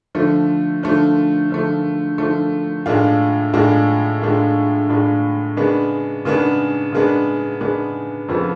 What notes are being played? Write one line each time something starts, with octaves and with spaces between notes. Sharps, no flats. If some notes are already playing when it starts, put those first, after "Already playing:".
D3 F3 A3
D3 F3 A3
D3 F3 A3
D3 F3 A3
A2 G#3 D4 F4
A2 G#3 D4 F4
A2 G#3 D4 F4
A2 G#3 D4 F4
C#3 G#3 B3 D4
C#3 G#3 B3 D4
C#3 G#3 B3 D4
C#3 G#3 B3 D4
F2 C#3 F3 B3